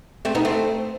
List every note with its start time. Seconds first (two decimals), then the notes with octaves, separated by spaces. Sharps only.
0.25 A3 C4
0.35 B3 D#4
0.45 A3 C4